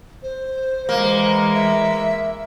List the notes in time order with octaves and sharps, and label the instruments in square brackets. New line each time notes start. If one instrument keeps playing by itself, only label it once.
[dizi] C5
[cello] E3 G#3 [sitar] A#3
[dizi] E5